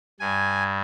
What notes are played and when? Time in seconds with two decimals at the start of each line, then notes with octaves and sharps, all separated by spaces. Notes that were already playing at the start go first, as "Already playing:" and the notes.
0.20 G2 G#5